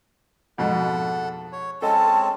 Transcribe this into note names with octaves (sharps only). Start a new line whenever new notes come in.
F2 G#2 B2 A4 F#5
C#5
G#3 C4 C#4 A4 D#5 A5